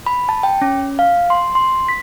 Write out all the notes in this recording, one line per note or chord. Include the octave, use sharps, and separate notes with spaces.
B5
A5
G5
C#4
F5
C6
C6
B6